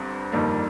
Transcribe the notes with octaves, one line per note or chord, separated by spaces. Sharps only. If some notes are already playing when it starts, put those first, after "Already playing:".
Already playing: G1 G2 C4
G1 F2 D#3 G3 A#3